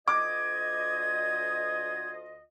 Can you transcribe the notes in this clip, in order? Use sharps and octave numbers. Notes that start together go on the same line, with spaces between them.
D2 F4 D#5 D6 G#6